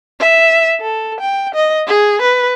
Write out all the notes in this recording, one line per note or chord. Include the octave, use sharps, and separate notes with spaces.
E5
A4
G5
D#5
G#4
B4